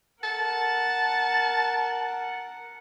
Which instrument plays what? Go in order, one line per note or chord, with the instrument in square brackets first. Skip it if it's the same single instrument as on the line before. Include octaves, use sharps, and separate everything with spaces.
[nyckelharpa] A#4 F#5 [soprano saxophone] A5